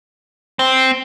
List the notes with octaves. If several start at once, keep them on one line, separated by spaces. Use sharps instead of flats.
C4